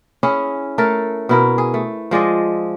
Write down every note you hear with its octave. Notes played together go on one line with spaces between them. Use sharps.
C#4 E4 G#4
A3 A4 A#4
B2 E4 A#4
G#4
A3
F3 G#3 D5 D#5